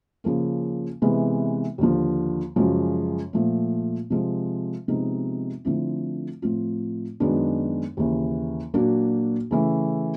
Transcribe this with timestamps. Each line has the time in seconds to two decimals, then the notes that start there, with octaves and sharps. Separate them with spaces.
0.24 C#3 F3 A#3 C#4
1.02 C3 E3 G#3 B3
1.78 D#2 D3 F3
2.56 F#2 C#3 F3 G#3
3.33 A#2 F3 A3
4.10 C3 F3 G#3
4.88 C3 F3 G#3 B3 D#4
5.65 D3 F3 A3 C4 E4
6.42 A2 F3 A3 C4 F4
7.20 F#2 D#3 G#3 B3 D4
7.97 D#2 C#3 E3
8.74 A#2 F#3 A#3 D4 F#4
9.51 C#3 E3 A3